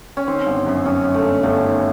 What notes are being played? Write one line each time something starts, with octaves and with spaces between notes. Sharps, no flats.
C#4
D#3 C4
G1
F#2
F#2 C#4
F#2
A3
G1
G1 A3
D#3